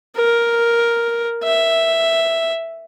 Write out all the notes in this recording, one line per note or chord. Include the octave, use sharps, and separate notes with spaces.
A#4
E5